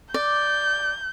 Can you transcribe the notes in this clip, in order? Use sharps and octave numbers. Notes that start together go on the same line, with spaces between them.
D5 G6